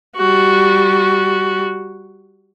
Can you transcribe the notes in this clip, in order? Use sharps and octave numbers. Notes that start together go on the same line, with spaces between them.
G3 F#4